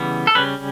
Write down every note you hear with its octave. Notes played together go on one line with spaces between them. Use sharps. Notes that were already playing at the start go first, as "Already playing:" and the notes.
Already playing: C#3 E3 G3 B3
A4
C#3 G3 C#4 B4